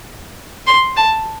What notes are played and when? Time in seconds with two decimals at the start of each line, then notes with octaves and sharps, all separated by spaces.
0.67 C6
0.96 A5